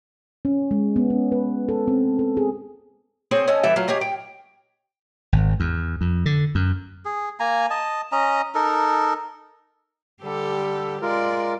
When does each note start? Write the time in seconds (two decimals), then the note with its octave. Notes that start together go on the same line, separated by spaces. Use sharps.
0.45 C#4
0.71 G#3
0.96 B3
1.10 C#4
1.32 B4
1.69 A4
1.88 C4
2.19 A4
2.37 G#4
3.31 C4 G#4 C5 C#5
3.48 C#4 A4 D#5 G#5
3.63 E3 G3 A4 E5
3.76 F#3 A3 F4
3.88 G4 G#4 C#5 D#5
4.01 G5
5.33 G#1
5.60 E2
6.01 F2
6.26 D3
6.55 F#2
7.05 G#4
7.40 A#3 G#5 A#5
7.70 D#5 A5
8.12 C#4 D#5 A#5
8.55 D#4 A4 A#4
10.23 D3 G3 G4 A4
11.02 G#3 F4 A#4 D5